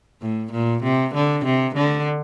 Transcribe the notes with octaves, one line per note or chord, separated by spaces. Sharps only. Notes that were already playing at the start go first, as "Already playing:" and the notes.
A2
A#2
C3
D3
C3
D3